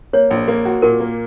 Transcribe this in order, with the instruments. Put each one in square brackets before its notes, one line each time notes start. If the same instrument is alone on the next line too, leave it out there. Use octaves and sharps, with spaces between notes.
[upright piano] A#3 [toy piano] C#5
[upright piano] A#1
A#3
F#4
[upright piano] A#2 [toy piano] A#4
[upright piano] A#3